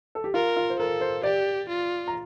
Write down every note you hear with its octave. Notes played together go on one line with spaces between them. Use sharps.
A4
G4
F4 A#4
F4
C5
A4 A#4
C5
G4 D5
F4
A#5